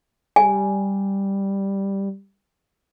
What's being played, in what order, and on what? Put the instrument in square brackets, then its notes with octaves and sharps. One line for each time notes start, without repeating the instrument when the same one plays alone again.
[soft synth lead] G3 [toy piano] G#5